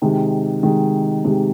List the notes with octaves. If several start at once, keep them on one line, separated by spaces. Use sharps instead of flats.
C3 D#3 G#3
C3 D#3 G#3
C3 D#3 G#3